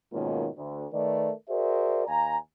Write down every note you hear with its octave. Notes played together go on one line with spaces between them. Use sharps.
G#2 B2 D#3 A#3 C#4 F4
D2
D#3 A3 A#4 B4 D5
F#4 G#4 A#4 C5 D5 E5
D#2 F5 G#5 A#5